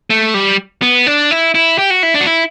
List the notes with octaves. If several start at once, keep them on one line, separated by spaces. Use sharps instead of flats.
A3
G3
B3
D4
E4
E4
G4
F#4
E4
D4
F#4
E4